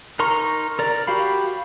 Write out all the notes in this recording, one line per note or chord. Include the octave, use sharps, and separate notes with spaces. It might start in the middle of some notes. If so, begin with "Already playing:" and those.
D#4 A#4 A#5 C6 C#6
A#4 D5
F#4 G4 F5 B5